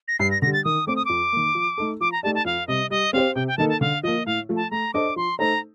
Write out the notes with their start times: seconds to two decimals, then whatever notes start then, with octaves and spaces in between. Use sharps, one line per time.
0.08 A#6
0.19 G2 C7
0.31 A#6
0.42 D3 G3 A#6
0.53 A6
0.65 D#3 D#6
0.87 A3 C4 D6
0.96 D#6
1.05 F2 D6
1.32 D#3 A#3
1.55 F3
1.78 A3 D#4 A4
2.00 F3 D6
2.12 A#5
2.23 A3 D#4 G4 D5 A5
2.35 A5
2.45 F2 F5
2.68 C3 G3 D#5
2.90 G3 D#5
3.13 C4 G4 C5 F5
3.35 C3 G5
3.47 G5
3.58 D#3 A#3 D#4 A4 A5
3.69 A5
3.81 D3 F5
4.03 F3 A#3 D#5
4.26 A2 F5
4.49 F3 A3
4.56 A5
4.71 A3 A#5
4.94 D4 A4 C5 D#5 D6
5.16 F3 C6
5.39 A3 D#4 A4 C5 A#5